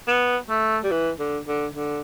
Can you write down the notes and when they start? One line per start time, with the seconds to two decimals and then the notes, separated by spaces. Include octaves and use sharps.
0.07 B3
0.49 A3
0.84 G3
0.91 E3
1.19 D3
1.48 D3
1.75 D3